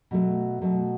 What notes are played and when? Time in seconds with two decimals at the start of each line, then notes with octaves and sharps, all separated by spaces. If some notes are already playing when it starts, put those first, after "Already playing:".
0.11 B2 F#3 A3
0.62 B2 F#3 A3